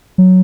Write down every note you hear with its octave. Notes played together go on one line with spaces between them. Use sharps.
F#3